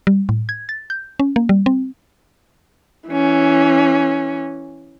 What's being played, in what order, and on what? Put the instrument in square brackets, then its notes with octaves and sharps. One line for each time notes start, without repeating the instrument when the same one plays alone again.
[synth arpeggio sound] G3
A2
G#6
A6
G6
C#4
A#3
G3
C4
[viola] E3 C#4